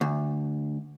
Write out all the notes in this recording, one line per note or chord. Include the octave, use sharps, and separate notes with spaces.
D2